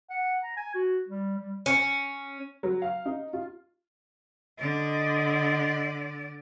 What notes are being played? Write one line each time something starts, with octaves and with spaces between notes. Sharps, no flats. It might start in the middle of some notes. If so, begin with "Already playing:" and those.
F#5
A#5
G#5
F#4
G3
G3
C#4
F#3
F5
D#4
F4
D3 D5 D#5